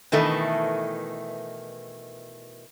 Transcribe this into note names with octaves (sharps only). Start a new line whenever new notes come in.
B2 D#3 E3 A3